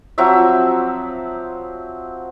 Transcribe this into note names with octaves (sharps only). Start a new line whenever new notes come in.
F3 F#3 C4 E5